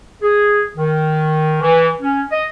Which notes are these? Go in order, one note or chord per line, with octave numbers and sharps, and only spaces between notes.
G#4
D#3
E3
C#4
D#5